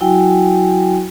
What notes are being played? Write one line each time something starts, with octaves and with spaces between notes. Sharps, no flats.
F#3 E4 F#4 G5 G#5